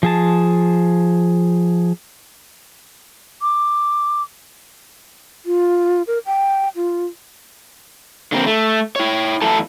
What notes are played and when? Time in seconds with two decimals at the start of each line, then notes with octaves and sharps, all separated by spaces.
0.03 F3 G#4 A5
3.42 D6
5.46 F4
6.07 A#4
6.26 G5
6.76 F4
8.32 D3 A#3 C4
8.46 A3
8.96 E4 C#5
9.42 E2 E3 F#3 A3 A4 A5